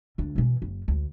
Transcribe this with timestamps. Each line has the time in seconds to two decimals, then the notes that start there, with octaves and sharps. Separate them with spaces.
0.18 D2 D4
0.36 B2 E3
0.62 F#1
0.88 D2